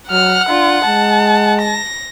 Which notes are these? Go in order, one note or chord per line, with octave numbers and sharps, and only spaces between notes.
F#3 F#5 F6
D4 F4
G#3 A5
A#6